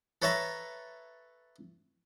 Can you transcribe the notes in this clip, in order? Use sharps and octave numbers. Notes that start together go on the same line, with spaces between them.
A4 B4 C#5 E5 A5 A#5